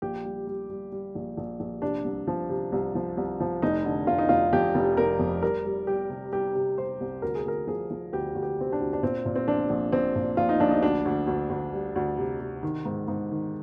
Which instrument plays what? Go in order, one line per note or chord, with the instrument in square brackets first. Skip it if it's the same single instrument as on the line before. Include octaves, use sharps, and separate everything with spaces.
[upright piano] A#1 G4
G3
G3
G3
G3
A#1
A#1
A#1
C3 D4
C2
F3
C3
C2
F3
C2
F3
F1 D#4
D3
F1 F4
D#4
F1 F4
F2 G4
F1
F1 A#4
F2
G3 A#4
G3
G3 G4
C3
G3 G4
C3
G3 C5
C2
D2 A#4
G#4
D2 A#4
F3 G#4
F3
D2 G4
D2
G4
C3 C4
D4
D2
D4
A#2 C4
A#2
C4
A#1 D4
A#1
A#1 C4
A#2
A#1 F4
D#4
A#1 D4
D#4
D2 D4
D2
D2
D2
G3
D2
C3
C3
D#3
G#2
G#2
D#3